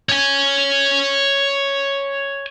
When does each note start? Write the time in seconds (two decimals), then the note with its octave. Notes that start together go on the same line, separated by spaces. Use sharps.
0.09 C#5 G#5